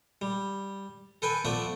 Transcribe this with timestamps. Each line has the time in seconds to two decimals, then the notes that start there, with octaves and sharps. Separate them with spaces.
0.22 G3
1.22 A4 B4 G5 G#5
1.45 F3 A3 B3 D5 E5